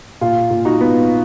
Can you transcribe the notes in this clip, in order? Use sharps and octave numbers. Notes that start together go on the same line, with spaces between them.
A#2 F4
A#2
D#4 F#4
B3